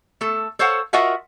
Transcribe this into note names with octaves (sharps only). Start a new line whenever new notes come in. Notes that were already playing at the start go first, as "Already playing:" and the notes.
A3 A4
A4 C5 C#5 F5 F#5
F4 F#4 A#4 D#5 E5 F#5